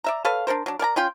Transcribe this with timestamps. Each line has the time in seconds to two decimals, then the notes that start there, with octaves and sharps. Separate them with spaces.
0.04 D5 E5 A#5
0.25 A4 B4 C#5 F5
0.47 D4 A4 A#4 C5
0.66 F#3 D4
0.79 A#4 D5 G#5 A#5
0.96 C#4 F4 G5 C6